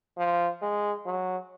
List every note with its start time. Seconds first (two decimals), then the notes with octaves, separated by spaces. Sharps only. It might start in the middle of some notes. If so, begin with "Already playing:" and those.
0.17 F3
0.62 G#3
1.06 F#3